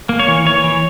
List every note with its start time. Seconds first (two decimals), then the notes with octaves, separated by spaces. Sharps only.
0.09 A#3
0.19 C#5
0.28 E3
0.45 E3 C#5
0.64 E3